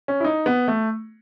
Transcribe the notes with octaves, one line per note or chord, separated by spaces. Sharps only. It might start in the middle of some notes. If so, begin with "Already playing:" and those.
C#4
E4
D#4
B3
A3